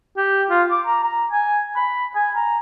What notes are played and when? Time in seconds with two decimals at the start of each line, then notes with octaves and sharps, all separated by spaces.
0.17 G4
0.50 F4
0.71 D6
0.87 A#5
1.03 A#5
1.31 G#5
1.76 B5
2.15 G#5
2.36 A#5